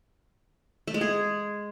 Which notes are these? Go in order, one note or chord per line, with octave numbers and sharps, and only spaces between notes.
A3
G#3
G#4